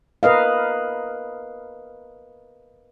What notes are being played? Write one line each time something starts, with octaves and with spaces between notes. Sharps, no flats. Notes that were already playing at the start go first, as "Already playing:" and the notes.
A#4 B4 D#5 F5